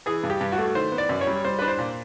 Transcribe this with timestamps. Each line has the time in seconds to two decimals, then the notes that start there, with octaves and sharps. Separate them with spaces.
0.06 E3 G#4
0.23 G2
0.30 G4
0.41 G2
0.52 F#4
0.58 A3
0.75 D#3 C5
0.92 B3
0.98 D5
1.09 F#2
1.21 C#5
1.27 G3
1.44 G3 C5
1.59 D4 B4
1.68 C5
1.79 A#2